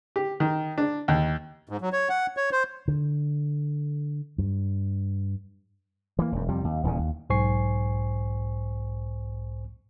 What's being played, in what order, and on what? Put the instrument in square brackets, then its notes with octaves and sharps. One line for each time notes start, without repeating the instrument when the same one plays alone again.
[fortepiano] G4
D#3
D4
D#2
[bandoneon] G#2
F#3
C#5
F#5
C#5
C5
[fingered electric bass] D3
G2
[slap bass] E3 A#3
E1 F#2
F2 C3 G3
D#2
D#1 E2 A#2 C#3
D#2
[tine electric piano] B1 G#2 C5 G#5 C#6 C7